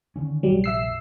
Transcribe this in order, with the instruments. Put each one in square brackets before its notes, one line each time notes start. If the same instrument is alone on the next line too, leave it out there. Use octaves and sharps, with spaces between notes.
[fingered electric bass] D3 D#3 C#4
[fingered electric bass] F1 A#1 [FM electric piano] F#3 G3
[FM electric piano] E5 E6 C7